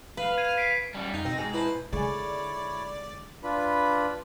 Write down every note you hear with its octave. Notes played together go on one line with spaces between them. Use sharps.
B4 F5
G#6 D#7
B6 C7 D7
G3 C#4
F2 D#4 F4
B2 C4 A#6
G#2 G#3
E4 B4 C5 A5
D3 G#3 E4 G#4 C#5 D5 G#5
D4 F4 B4 B5